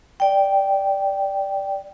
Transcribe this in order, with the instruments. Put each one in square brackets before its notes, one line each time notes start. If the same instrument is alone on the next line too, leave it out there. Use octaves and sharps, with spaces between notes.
[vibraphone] D5 G5